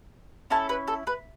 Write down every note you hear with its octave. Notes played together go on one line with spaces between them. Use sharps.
C#4 E4 A4 A5
B4
A4
B4